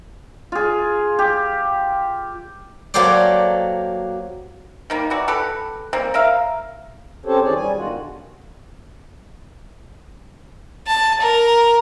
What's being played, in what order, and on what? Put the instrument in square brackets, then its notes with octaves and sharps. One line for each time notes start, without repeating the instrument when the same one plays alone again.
[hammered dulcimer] F4 G#4
G4
[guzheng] F#3 A#3 G4 A4 C5 D5
[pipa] D#3 G3 A#3
E3 F#4 D5
G4 A4 B4
G3 A#3 C4
A#4 E5 F5
[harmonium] C4 C#4 G4 A4 C5 C#5
D#3 E3 G#4 C#5 D5
G2 G3 G#5
B2 D3 D#3 G#3 F4 F#4
D3
[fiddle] A5
A#4